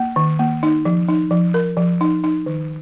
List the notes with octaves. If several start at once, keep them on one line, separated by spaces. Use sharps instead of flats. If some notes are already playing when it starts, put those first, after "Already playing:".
Already playing: A#3
D#3
A#3
D#4
F3
D#4
F3
A#4
F3
D#4
D#4
D#3